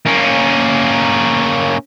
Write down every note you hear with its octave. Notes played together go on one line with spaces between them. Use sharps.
A#3 C#4